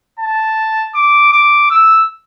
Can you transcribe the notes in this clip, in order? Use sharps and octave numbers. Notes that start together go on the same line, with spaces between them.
A5
D6
D6
E6